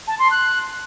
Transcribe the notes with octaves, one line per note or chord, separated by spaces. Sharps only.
A5
C6
F#6